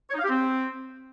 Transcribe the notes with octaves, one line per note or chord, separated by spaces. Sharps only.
C#5
D#4
F5
G4
C4